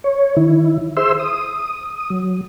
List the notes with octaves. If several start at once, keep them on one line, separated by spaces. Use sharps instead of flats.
C#5
D#3 E4
G#4 C5 E5 C6 E6
D#6
F#3